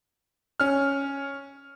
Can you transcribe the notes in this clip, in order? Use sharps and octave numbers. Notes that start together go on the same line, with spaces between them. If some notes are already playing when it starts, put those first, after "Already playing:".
C#4 F6